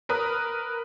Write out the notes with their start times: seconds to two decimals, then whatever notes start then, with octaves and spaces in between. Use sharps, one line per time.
0.09 A#4 B4 D#6